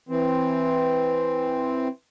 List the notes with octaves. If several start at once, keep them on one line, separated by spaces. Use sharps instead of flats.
E3 C4